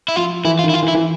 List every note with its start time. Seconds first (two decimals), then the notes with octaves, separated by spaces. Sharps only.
0.08 E4
0.16 F3 F4
0.44 E3 E4
0.59 F4
0.64 D#3
0.69 E4
0.73 F4
0.83 E3
0.88 E4
0.95 E3